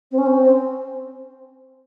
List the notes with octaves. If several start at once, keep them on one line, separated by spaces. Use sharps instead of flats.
C4
C#4
C4